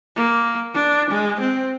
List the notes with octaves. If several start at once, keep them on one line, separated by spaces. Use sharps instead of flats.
A#3
D4
G#3
C4